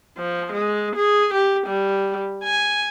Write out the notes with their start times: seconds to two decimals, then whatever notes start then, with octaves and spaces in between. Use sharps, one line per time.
0.18 F3
0.52 G#3
0.96 G#4
1.34 G4
1.67 G3
2.45 G#5